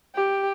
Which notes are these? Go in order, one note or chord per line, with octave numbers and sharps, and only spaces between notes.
G4